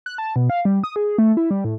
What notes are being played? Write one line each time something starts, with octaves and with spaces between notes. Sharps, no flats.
F#6
A5
B2
F5
G3
D#6
G#4
A3
E4
G3
A2